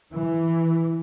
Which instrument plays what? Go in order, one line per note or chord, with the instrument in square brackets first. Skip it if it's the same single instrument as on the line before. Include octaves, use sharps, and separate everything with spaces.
[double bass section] E3